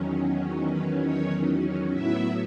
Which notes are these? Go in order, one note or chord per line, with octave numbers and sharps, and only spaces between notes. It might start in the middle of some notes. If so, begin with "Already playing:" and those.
Already playing: E2 D#3 F#3 C#4
B4
C#5
A2 F#3 B3 E4 E5